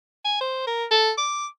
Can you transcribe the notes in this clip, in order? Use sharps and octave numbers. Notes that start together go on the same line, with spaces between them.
G#5
C5
A#4
A4
D6